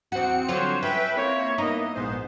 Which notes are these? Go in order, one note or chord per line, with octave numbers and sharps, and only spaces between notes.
E2 C4 F#4 C#7
D3 F#3 F4 C5 C#5
C#4 B4 E5 G5 B5
A#3 C4 E4 C#5
B3 D#4 D#5
A#1 G#2 B3 C5